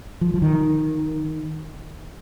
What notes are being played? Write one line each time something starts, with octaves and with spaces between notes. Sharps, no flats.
F3
F3
D#3